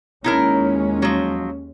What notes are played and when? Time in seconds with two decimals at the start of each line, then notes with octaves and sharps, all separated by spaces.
0.24 D#2 G#3 C#4 D#4 E4 A#4
1.02 F3 F#3